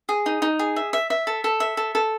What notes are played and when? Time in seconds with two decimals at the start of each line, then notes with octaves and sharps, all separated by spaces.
0.09 G#4
0.26 D#4
0.42 D#4
0.59 G#4
0.76 E5
0.93 E5
1.10 E5
1.27 A4
1.44 A4
1.60 E5
1.77 A4
1.95 A4